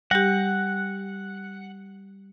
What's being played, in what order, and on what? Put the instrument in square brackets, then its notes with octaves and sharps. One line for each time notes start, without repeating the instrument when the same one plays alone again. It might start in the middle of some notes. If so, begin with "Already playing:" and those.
[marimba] G3 G4 [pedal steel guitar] F#5